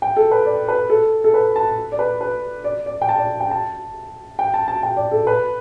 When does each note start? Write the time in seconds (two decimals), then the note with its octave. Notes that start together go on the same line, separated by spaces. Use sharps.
0.02 G5
0.17 A4
0.32 B4
0.46 D5
0.68 B4
0.90 A4
1.24 A4
1.34 B4
1.56 A5
1.92 D5
1.99 B4
2.21 B4
2.64 D5
2.86 D5
3.02 G5
3.09 A5
3.18 D5
3.40 G5
3.51 A5
4.39 G5
4.54 A5
4.68 A5
4.83 G5
4.97 D5
5.11 A4
5.27 B4